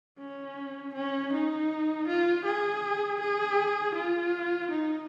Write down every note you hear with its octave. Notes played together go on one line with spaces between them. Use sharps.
C#4
C#4
D#4
F4
G#4
G#4
F4
D#4